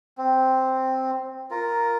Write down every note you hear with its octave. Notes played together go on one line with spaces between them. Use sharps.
C4
F4 A#4